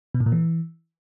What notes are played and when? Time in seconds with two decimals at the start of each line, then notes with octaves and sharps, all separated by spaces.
0.15 B2
0.20 A2
0.26 A#2
0.32 E3